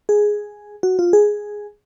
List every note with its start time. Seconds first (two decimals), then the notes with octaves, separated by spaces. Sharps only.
0.09 G#4
0.83 F#4
0.99 F4
1.13 G#4